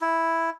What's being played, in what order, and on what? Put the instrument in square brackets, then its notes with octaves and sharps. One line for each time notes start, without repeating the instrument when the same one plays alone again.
[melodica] E4